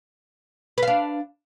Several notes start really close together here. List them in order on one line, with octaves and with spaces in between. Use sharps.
B4 F5 D4